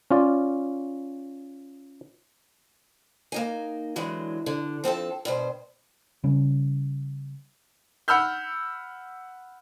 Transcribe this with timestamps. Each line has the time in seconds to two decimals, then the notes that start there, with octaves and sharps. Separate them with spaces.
0.11 C#4 F4 D5
3.32 A#3 D#4 G#5
3.96 D3 E3 F#3 G#3
4.46 D3
4.84 F3 C4 A4 A5
5.25 G2 B2 C5
6.24 C#3 G3 C#4
8.08 F#5 B5 E6 F6 G6